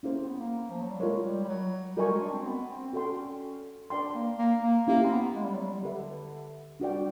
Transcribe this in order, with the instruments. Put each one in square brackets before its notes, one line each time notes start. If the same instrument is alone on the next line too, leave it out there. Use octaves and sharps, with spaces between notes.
[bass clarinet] A#3 [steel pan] C#4 E4 G#4 C5
[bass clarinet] C4
B3
A#3
F3
F#3
G3
[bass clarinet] G#3 [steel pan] F4 A#4 C#5
[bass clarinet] G3
G3
F#3
[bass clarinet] G3 [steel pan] F#4 A#4 D#5 G#5 C#6
[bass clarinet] G#3
D4
C4
B3
C4
[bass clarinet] C#4 [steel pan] F#4 A4 D5 G5 C6
[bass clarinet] D4 [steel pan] B4 D5 G5 C6
[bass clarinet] A#3
A#3
A#3
[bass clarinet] A#3 [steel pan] C#4 E4 G4
[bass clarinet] C4
B3
G#3
G3
F#3
G3
[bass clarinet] D3 [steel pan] G4 B4 E5
[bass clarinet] G3 [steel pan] D4 F#4 B4 D5 G5